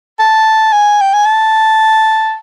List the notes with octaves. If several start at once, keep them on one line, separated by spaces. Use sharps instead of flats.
A5
G#5
G5
G#5
A5